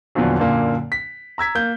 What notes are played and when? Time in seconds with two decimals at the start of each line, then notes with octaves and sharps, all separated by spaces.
0.15 E2 A#2 D3 F3 F#3
0.39 F#2 A#2 D3 A#3
0.92 B6
1.38 A#5 E6 G#6 B6
1.55 A#3 G6